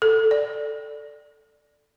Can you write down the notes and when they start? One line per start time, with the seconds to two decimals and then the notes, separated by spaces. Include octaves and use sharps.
0.02 A4
0.31 D5